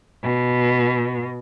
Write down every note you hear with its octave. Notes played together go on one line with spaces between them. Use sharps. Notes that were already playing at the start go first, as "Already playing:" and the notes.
B2